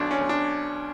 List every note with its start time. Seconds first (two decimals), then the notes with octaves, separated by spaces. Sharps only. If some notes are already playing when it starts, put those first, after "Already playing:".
Already playing: B1 F#3 D4
0.11 C#4
0.21 B1
0.29 D4